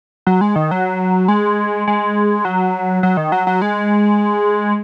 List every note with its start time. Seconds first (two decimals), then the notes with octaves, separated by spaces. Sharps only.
0.27 F#3
0.41 G#3
0.56 D#3
0.71 F#3
1.28 G#3
1.87 G#3
2.45 F#3
3.03 F#3
3.17 D#3
3.32 F#3
3.47 F#3
3.62 G#3